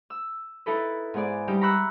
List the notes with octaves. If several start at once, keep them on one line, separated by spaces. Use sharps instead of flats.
E6
D#4 E4 A4 B4
G#2 B3 G#4 D5
G3 D#4 G4
A#5 B5 C#6 E6 F#6